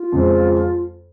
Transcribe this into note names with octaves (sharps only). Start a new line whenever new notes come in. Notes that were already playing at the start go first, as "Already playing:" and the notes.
Already playing: F4
F2 C#3 G#3 C4